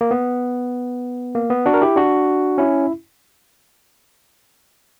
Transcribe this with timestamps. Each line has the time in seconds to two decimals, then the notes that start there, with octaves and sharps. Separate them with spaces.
0.01 A#3
0.11 B3
1.35 A#3
1.50 B3
1.66 D4 F#4
1.74 A#4
1.82 E4 G4
1.96 D4 F#4
2.58 C#4 E4